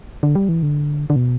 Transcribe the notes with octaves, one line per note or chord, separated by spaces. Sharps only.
D3
G3
E3
D3
D3
B2